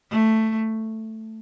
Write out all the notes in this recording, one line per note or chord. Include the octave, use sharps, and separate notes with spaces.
A3